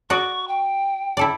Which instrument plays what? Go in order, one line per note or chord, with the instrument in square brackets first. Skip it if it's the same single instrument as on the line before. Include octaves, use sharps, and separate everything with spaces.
[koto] F#4 D5 D#5 [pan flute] C#6
[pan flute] G5
[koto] E4 A4 D5